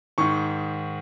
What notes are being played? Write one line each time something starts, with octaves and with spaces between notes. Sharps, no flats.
G#2 D#3 C#6